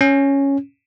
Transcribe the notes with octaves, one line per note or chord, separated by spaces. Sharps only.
C#4